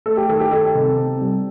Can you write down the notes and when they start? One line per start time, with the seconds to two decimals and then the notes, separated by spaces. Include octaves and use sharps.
0.06 A3 A4
0.17 G4
0.29 D#3 A4
0.40 G4
0.51 D#4 A4
0.75 C3
0.97 C4
1.21 G3